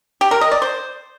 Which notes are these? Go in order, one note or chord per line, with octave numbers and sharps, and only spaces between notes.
G4
A#4
D#5
D5
C5